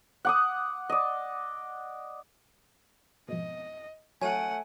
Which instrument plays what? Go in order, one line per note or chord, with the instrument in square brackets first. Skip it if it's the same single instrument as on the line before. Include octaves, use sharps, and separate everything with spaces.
[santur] F#5 D6 D#6
D5 D#5
[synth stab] F2 G#2 B2 [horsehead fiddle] D#5
[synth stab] F#3 C#5 D#7 [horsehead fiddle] A3 F#5 [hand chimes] G#5